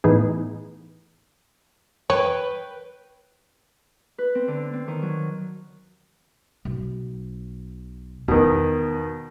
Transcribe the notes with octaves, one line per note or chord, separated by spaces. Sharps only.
A2 E3 B3 D#4 G#4
B4 C#5 G5
B4
C4
D3
C4
D#3
F#3
B1
E2 B2 D#3 B3